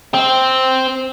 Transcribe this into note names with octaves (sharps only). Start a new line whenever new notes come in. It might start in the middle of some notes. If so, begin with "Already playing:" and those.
C4